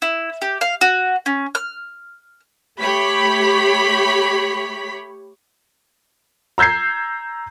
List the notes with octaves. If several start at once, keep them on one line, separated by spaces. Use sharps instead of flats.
E4
G4
F5
F#4
C#4
F6
A3 G4 C#5 B5 B6
A#5 E6 G6 G#6 C7